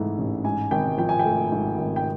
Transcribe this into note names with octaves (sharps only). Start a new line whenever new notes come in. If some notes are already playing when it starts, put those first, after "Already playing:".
Already playing: G#2 E3 A3
A1
G#2 G#5
G#1 G5
F3 G5
G#5
G5
A3
G#2
G#1
G5